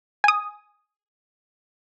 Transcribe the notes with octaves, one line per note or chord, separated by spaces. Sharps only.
G#5 D#6